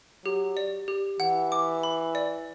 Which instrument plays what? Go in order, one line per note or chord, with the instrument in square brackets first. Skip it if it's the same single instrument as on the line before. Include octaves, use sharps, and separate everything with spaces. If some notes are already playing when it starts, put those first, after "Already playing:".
[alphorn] F#3 [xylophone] G4
[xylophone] D5
G4
[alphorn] E3 [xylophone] F#5
[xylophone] D6
B5
D5